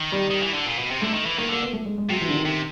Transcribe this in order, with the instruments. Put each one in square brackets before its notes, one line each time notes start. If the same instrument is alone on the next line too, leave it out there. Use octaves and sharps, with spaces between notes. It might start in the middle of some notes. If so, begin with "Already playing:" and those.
Already playing: [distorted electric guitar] D#3
[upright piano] G3
[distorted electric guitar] D#3
E3
D3
A#2
B2
C3
[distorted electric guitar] D3 [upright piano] A3
[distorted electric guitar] D#3
E3
[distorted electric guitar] D#3 [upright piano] A#3
[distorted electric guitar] D3 [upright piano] A#3
[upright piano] B3
A3
G#3
G#3
[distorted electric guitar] C3 [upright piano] F#3
[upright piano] E3
D3
D#3
[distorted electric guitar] C3